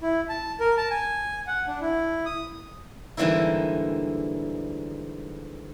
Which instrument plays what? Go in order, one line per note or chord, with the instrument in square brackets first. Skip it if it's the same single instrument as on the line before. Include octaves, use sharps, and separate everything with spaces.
[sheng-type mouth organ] E4
A5
A#4
A5
G#5
F#5
D4
E4
D#6
[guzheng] G#2 D3 E3 G3 A#3 E4